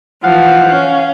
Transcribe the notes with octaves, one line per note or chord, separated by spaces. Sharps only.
E3 F3 F5 F#5
C#4